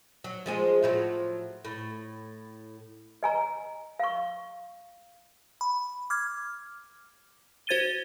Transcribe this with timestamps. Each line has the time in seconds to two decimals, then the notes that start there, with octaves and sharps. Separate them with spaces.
0.24 F#3
0.46 F3 G#3 G#4
0.83 A2 F3 F#3
1.65 A2
3.23 D#5 G#5 A#5
4.00 F5 C#6
5.61 B5
6.10 D6 F6 G#6
7.67 F#4 C5 G#6 A6 D#7 G7